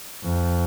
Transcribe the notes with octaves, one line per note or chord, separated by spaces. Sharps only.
F2